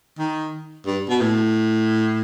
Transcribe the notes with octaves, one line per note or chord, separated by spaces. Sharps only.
D#3
G2
B2
A2